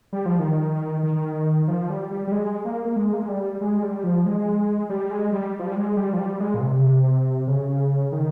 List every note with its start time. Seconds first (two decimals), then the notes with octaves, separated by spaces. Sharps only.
0.13 G3
0.26 F3
0.39 D#3
1.03 D#3
1.68 F3
1.90 G3
2.11 G3
2.27 G3
2.32 G#3
2.65 A#3
2.85 A#3
2.96 G#3
3.13 A#3
3.21 G#3
3.29 G3
3.61 G#3
3.83 G3
4.04 F3
4.26 G#3
4.90 G3
5.11 G#3
5.32 G3
5.59 F3
5.67 G3
5.76 G#3
5.97 G3
6.13 F3
6.19 G3
6.40 G#3
6.54 A#2
6.61 C3
6.79 C#3
6.83 C3
7.47 C#3
8.12 D#3